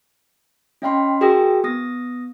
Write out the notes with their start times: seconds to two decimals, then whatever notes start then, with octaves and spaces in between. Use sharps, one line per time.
0.82 C#4 D#5 F5 G5 B5 C6
1.21 F#4 G#4 A#4 G5 D#6 A#6
1.64 B3 D#6 A#6